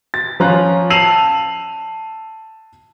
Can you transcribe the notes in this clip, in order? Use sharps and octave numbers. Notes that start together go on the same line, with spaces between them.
A6
F3 C#4 F4 A#5 F#6
A5 E6 C7 D#7 F7 F#7